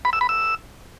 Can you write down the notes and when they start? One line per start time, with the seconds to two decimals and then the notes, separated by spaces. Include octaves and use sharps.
0.05 B5
0.13 E6
0.21 B5
0.29 E6